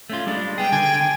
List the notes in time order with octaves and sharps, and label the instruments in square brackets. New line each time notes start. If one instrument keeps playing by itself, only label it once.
[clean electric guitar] A3 C#4 F4
G3 G#3 D4
[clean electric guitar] G3 B3 G#4 [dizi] G5
[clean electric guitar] D3 [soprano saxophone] G#5